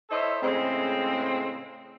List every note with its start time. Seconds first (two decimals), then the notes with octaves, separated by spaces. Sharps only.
0.10 E4 A4 C5 C#5 D#5 E5
0.42 A2 C#3 G#3 C4